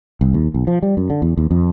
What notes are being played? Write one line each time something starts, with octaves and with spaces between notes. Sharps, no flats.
C2
D#2
B1
F3
G3
F#2
D3
E2
D#2
F2